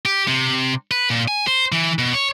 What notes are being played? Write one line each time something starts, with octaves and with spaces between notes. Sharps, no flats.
G4
C3
B4
A#2
G#5
C5
E3
B2
C#5